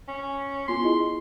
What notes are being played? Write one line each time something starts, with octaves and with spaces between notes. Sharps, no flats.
C#4
B3 F4 C6
E4 G#4 D#5